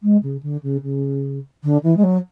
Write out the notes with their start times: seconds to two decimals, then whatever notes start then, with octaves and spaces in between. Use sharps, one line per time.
0.02 G#3
0.23 C#3
0.42 D3
0.63 C#3
0.83 C#3
1.63 D3
1.83 E3
1.97 G#3
2.03 F#3